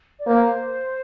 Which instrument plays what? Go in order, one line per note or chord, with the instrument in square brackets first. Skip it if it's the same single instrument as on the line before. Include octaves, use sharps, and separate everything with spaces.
[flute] D5
[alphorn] A#3 [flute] C5